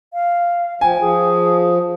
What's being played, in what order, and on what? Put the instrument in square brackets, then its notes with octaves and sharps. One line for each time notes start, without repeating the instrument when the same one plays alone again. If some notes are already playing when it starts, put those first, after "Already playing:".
[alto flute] F5
[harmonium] F3 [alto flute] G5 [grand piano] G#5
[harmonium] F3 [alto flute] G#4